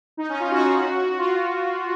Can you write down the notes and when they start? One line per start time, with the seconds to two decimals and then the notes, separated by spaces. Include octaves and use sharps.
0.17 D#4
0.29 C#4
0.40 F4
0.52 F#4
1.18 F4